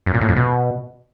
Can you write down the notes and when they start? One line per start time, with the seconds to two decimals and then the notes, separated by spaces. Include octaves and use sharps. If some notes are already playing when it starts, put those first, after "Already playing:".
0.06 F#2
0.14 A#2
0.21 A2
0.29 F2
0.36 B2